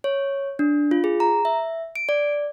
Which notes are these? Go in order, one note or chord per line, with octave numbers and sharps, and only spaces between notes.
C#5
D4
F4
G#4
A#5
E5
D7
D5